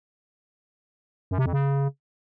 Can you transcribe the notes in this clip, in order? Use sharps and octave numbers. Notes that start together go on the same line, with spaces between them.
F#2
C3
F2
C#3